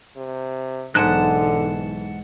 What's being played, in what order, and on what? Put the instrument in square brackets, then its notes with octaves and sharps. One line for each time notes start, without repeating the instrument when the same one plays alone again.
[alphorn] C3
[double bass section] B1 E3 [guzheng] G#2 [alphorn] D3 [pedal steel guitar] F#5 A5 F#6